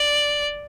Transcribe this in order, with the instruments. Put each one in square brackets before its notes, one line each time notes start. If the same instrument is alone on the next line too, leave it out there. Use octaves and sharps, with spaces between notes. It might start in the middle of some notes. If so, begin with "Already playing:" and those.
Already playing: [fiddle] D5